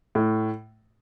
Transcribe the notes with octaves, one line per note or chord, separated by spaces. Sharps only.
A2